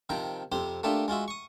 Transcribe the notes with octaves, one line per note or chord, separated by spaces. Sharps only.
C3 D#3 F3 G5 A#5
F2 C3 G4 C5
A3 A#3 D4 F4 G4 E5
G#3 F4 F#4 E5
C#6 D#6